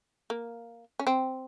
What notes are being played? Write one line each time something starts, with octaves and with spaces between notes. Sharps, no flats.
A#3
C#4
C4